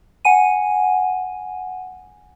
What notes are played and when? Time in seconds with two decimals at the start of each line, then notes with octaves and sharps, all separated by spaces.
0.25 F#5 G#5 D#7